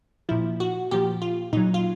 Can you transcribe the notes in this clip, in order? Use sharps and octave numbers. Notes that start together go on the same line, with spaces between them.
A#2 F3 E4
F#4
A#2 F3 G4
F4
A#2 F#3 D#4
F4